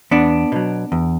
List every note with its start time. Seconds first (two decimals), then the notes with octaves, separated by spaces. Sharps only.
0.11 E2 B3 D4
0.52 B2 F#3
0.92 E2